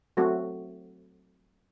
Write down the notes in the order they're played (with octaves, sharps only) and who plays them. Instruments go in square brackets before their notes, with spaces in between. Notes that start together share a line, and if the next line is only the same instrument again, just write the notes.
[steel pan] F#3 A3 C4 F#4